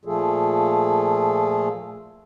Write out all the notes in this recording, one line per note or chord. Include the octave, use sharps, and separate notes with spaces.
A#2 F3 A3 F4 G#4 A4